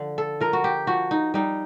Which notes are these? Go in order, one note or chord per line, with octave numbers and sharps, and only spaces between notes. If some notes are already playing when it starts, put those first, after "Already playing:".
Already playing: D3 F3
A4
F3 A#4
F#4
G4
F3 F#4
D#4
G3 D#4